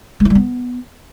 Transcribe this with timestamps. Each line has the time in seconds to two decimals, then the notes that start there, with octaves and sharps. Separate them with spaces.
0.20 G#3
0.25 E4
0.30 G3
0.35 B3